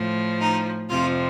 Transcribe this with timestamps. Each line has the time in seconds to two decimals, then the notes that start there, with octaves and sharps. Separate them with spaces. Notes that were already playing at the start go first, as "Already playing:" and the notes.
Already playing: A2 F3
0.40 D#4
0.89 F2 C3 F3 F4